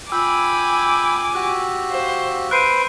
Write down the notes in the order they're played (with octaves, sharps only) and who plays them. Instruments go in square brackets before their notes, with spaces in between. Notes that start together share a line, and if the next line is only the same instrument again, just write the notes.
[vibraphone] F4 [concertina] G5 B5 [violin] G#5 D6 [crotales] E6
[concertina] F#4 G4 F#6
[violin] C5 [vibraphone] F5
[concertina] B4 C5 [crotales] F#6 C7 D#7 [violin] D7